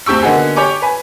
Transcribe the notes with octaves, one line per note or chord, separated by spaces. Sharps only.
D2 C4 G4 C#6 E6
D3 A#3 B3 D#4 F#4 G#4
G4 C#5 G#5 D6
B4 G#5